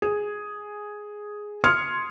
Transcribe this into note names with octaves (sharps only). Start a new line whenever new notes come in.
G#4
C6 D#6 F6 G#6 C#7